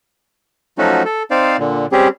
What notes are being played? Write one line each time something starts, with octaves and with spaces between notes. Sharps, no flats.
F3 F#3 A3 C#4 D#4 F#4
A4
C4 D#4 C5 D5 F5
A#2 D3
G3 C4 C#4 G4 G#4